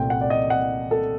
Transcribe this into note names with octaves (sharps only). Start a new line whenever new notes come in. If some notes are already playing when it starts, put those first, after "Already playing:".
Already playing: C2 A#2 A3 C4 G5
F#5
D5
D#5
F#5
A4